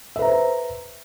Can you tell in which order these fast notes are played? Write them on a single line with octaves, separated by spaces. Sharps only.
E5 B4 A#5 C5